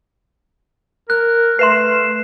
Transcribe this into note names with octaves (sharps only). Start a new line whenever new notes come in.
A#4 F#6
A3 B4 E5 C6 C7 E7